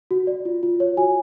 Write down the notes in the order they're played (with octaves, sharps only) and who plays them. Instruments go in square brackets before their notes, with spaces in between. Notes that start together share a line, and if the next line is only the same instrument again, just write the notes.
[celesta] F#4
D5
F4
F4
C#5
F#4 G#5